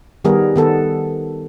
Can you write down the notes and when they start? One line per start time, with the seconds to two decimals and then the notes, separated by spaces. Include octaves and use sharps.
0.24 D#3 G3 B3 G#4 A#4
0.56 D#3 B3 A4